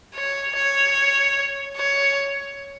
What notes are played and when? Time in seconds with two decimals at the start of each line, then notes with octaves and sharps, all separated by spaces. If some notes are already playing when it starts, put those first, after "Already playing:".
0.15 C#5
0.55 C#5
1.77 C#5